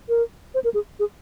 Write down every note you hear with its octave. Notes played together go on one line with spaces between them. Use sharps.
A#4
C5
A#4
G#4
G#4